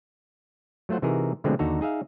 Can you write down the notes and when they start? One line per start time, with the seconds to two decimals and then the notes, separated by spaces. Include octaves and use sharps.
0.89 F#3 A3 F4 C5 F#5
1.02 C3 E3 D#4 F#4 G#4 A#4
1.44 B2 D3 F3 G#3 A3 C4
1.59 D#2 D3 D#4 F#4 A4 A#5
1.81 D#4 G#4 E5 F5